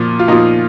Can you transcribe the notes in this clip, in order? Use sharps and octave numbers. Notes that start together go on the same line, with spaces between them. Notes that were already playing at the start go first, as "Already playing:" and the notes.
Already playing: A#2 F3
F4
A#2 F3 D#4